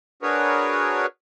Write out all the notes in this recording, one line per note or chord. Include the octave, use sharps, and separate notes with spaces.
D4 F#4 G#4 A#4 B4 C#5